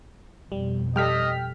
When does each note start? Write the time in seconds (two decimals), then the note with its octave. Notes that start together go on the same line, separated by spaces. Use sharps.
0.52 F2 B2 G3
0.96 G3 A4 D#5 G5 F6 B6